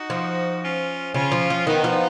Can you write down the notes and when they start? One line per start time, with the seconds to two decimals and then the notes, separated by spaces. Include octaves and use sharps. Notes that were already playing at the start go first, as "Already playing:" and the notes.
Already playing: D#4 F#4
0.10 F3
0.63 C#4 F4
1.14 C#3 C#4 F4
1.32 F3
1.50 F3
1.67 D#3 B3 D#4
1.84 F3